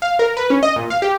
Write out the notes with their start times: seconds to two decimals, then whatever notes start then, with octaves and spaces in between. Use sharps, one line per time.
0.02 F5
0.19 A#4
0.37 B4
0.50 C#4
0.63 D#5
0.76 A#2
0.90 F5
1.02 G4